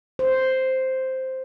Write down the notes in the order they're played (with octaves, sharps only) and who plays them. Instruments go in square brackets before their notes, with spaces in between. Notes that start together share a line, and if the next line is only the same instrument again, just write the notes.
[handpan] C5